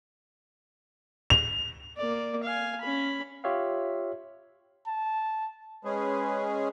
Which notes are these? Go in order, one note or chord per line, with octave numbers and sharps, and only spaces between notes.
F7
A#3 D5
F5 G#5
C#4 B5
F4 G4 C#5 E5 F5
A5
G#3 C#4 G#4 B4